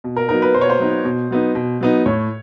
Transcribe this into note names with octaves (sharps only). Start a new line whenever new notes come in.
B2
A#4
F#3 B3 D#4 A#4
B4
B2 C5
C#5
C5
F#3 B3 D#4
B2
F#3 B3 D#4
B2
F#3 B3 D#4
A2 C#5